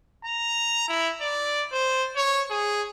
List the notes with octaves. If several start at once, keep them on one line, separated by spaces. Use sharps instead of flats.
A#5
E4
D5
C5
C#5
G#4